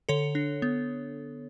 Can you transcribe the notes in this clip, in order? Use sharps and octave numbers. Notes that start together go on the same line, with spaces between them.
D3 A4 C#5
D4
B3